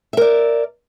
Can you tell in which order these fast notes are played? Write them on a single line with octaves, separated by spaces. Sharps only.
E5 A#4 D5